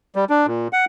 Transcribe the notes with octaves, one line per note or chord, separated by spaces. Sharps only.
G3
D4
A#2
F#5